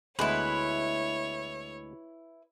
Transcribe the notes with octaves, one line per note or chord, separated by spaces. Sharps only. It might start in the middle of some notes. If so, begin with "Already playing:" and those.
D2 G#3 B3 E4 B4 C#5